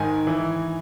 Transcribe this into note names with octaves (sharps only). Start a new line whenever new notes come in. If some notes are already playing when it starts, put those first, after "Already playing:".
Already playing: G#2 D#3 G#5
E3